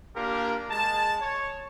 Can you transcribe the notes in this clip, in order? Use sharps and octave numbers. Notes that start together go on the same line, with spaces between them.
A#3 D4 F4 G4 A#4
G#3 A5
C#5